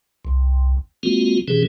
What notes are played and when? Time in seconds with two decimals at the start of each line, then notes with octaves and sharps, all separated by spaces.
0.25 C2
1.03 G#3 A#3 C4 F4 F#4
1.48 B2 E3 C#4 G4 G#4